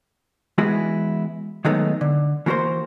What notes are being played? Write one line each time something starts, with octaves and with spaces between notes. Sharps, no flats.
E3 G#3 B3 E4 F#4 G#4
D#3 F#3 G#3 A3 B3 D#4
D3
E3 A#3 F#4 A#4 C5